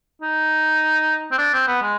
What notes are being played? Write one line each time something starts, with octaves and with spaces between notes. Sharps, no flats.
D#4
C4
D4
C4
B3
G#3